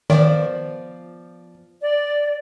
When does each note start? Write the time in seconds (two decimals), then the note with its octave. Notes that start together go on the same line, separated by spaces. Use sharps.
0.10 D#3 F3 B3 D5
1.82 D5